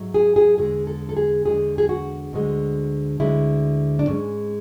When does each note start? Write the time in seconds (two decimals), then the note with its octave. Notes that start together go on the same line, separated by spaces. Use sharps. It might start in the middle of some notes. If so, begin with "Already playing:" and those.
Already playing: G#2 F#3 A3
0.14 G#4
0.36 G#4
0.58 E2 D3 G#3 G#4
0.87 A4
1.09 A4
1.17 G#4
1.45 E2 D3 G#3 G#4
1.78 G#4
1.89 F#4
2.33 D2 D3 G#3
3.20 D2 D3 G#3 E4
3.99 D4
4.07 G#2 G#3 C#4